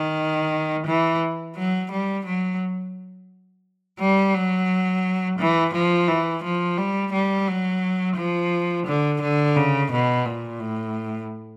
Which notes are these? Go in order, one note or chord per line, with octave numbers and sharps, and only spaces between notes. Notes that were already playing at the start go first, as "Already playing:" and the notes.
Already playing: D#3
E3
F#3
G3
F#3
G3
F#3
E3
F3
E3
F3
G3
G3
F#3
F3
D3
D3
C#3
B2
A#2
A2